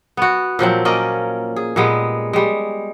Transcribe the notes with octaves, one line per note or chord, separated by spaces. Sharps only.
B3 F#4
A#2 F3 F#3 C4
A#3 C#4 D5 D#5
G#4
A#2 G3 G#3 B3
G3 G#3